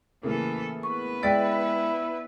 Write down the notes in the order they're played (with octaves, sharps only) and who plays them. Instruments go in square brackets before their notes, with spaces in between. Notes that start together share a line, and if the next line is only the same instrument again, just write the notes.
[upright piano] A2 C#3 A#3 [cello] E3 A4
[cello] B3 B4 [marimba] C#6
[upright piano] G#3 A6 B6 [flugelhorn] E4 [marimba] D5 G5